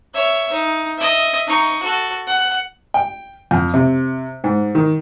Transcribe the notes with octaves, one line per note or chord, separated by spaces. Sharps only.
C#5 E5
D#4
D#5 E5
D#4 C#6
F#4 A4
F#5
G5
F2
C3
G#2
D#3